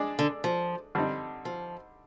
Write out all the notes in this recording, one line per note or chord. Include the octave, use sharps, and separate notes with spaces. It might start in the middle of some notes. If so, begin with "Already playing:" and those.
Already playing: G#3 D4 G#4 D5
D3
F3
D3 G3 C4 D#4
F3